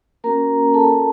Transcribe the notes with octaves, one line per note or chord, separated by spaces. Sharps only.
A#3 C#4 F#4 A#4 A#5
A4 A5